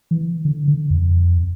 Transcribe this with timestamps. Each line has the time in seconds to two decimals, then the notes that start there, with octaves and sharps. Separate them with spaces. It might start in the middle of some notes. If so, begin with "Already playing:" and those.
0.11 E3
0.45 D3
0.68 D3
0.90 F2